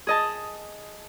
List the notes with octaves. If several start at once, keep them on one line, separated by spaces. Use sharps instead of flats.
G#4 D#5 A5